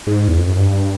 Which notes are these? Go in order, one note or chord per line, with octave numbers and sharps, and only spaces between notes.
G#2
E2
F2
F#2
G2